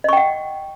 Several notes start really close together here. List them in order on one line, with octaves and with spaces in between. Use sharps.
D#5 C#6 G5 F#5